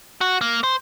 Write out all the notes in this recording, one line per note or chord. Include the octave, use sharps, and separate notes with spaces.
F#4
A#3
C5